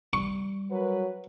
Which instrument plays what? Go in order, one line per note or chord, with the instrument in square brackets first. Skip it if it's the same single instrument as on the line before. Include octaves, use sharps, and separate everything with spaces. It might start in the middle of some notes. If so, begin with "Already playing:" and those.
[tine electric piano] G3 [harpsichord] C#6
[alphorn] F#3 [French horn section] A#4 B4